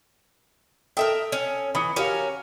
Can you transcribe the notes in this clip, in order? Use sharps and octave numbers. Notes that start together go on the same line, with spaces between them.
A4 A#4 E5 G5 D#6
C#4
E3 B5 D#6 C#7
C#4 F#4 G4 A#4 F5